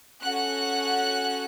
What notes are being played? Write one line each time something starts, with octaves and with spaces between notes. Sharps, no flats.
C#4 F#4 A4 F#5 F#6